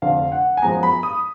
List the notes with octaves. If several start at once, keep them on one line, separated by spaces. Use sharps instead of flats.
F1 F2 D3 F5
F#5
G#5
F#2 F3 G#3 B3 A#5
B5
D#6